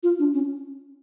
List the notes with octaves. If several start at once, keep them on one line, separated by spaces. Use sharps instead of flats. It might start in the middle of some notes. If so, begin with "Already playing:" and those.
F4
D4
C#4